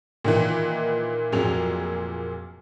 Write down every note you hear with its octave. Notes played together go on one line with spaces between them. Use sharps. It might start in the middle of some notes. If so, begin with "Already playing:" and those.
A#2 D#3 E3
F1 A#2 F#3 G#4 F7